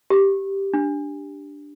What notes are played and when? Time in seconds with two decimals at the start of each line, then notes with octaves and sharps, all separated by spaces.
0.10 G4
0.74 D4